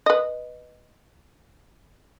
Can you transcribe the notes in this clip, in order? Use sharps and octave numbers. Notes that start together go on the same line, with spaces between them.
B4 D#5